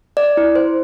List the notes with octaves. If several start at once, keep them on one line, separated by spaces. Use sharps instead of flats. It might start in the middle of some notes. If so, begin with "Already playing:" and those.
D5
E4
C5